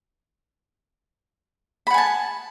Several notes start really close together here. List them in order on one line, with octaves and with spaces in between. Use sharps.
B5 F#5 G#5 A5